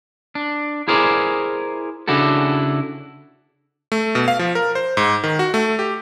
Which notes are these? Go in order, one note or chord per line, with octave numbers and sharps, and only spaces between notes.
D4
E4 G#4 A#4 C5 D5
C#3 D4 E4 F#4 A4
A3
B2
F5
F3
A#4
C5
G#2
D#3
F#4
A3
G4